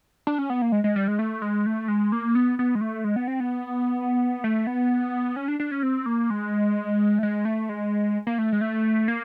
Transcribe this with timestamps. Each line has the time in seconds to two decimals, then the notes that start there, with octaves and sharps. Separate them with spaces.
0.27 D4
0.39 C#4
0.50 B3
0.62 A#3
0.72 G#3
0.84 G#3
0.96 G3
1.08 G#3
1.19 A3
1.42 G#3
1.66 A3
1.88 G#3
2.12 A#3
2.35 B3
2.59 B3
2.75 G#3
2.81 A3
3.04 G#3
3.16 B3
3.28 C4
3.40 B3
4.44 A3
4.67 B3
5.36 C#4
5.48 D4
5.60 D4
5.71 C#4
5.83 C4
6.06 A#3
6.30 G#3
7.19 A3
7.23 G#3
7.45 A3
7.69 G#3
8.27 A#3
8.38 A3
8.52 G#3
8.61 A3
9.08 A#3